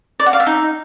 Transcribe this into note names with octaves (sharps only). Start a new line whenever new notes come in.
D5
F#5
F5
E5
D#4